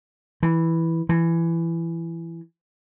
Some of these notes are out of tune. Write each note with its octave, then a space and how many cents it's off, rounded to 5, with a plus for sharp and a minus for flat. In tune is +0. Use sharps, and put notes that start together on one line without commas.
E3 -5
E3 +15